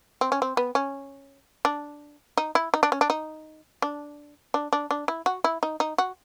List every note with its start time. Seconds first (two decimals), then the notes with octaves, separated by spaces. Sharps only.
0.21 C4
0.32 C#4
0.42 C4
0.57 B3
0.75 C#4
1.65 D4
2.37 D#4
2.55 E4
2.74 D#4
2.83 D4
2.92 C#4
3.01 D4
3.10 D#4
3.82 D4
4.54 D4
4.73 D4
4.91 D4
5.08 E4
5.26 F#4
5.44 E4
5.63 D#4
5.80 D#4
5.98 F#4